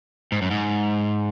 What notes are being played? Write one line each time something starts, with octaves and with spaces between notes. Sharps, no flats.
G#2
F#2
G#2